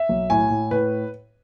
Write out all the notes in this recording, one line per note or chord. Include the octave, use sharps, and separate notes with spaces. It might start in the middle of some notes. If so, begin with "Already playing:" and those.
Already playing: E5
B1
A2 G#5
A2
A2 B4